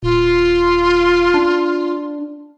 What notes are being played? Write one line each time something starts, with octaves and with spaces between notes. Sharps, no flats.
D#1 F4
D4